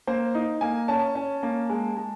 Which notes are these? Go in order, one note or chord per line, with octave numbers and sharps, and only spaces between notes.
A#3 C5
D#4
A#3 G#5
C#4 A5
C#4
A#3
G#3
G#3